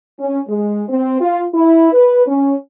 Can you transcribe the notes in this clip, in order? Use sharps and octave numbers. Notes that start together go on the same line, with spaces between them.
C#4
G#3
C4
F4
E4
B4
C#4